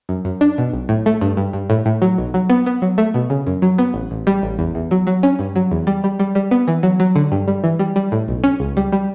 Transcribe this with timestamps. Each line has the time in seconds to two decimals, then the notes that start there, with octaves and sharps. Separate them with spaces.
0.09 F#2
0.25 F#2
0.41 D4
0.58 B2
0.73 B1
0.89 A2
1.06 A3
1.21 G2
1.37 G2
1.53 G2
1.70 A2
1.86 A2
2.02 F#3
2.18 B1
2.34 F#3
2.50 B3
2.66 B3
2.82 F#3
2.98 A3
3.14 B2
3.30 C#3
3.47 F#2
3.62 F#3
3.78 B3
3.94 A1
4.11 A1
4.27 G3
4.43 A1
4.59 E2
4.75 E2
4.91 F#3
5.07 F#3
5.23 C#4
5.39 G2
5.56 F#3
5.71 E2
5.87 G3
6.04 G3
6.19 G3
6.35 G3
6.51 B3
6.68 E3
6.83 F#3
7.00 F#3
7.16 D3
7.32 G2
7.48 G3
7.64 E3
7.79 G3
7.96 G3
8.12 A2
8.28 B1
8.44 C#4
8.60 C#2
8.77 G3
8.92 G3